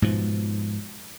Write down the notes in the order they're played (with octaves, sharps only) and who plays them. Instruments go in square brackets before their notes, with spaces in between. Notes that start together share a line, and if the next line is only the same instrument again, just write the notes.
[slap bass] G#2 B2 F3